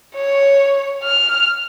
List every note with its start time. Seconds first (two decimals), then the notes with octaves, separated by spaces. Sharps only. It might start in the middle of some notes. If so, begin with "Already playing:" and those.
0.15 C#5
1.03 F6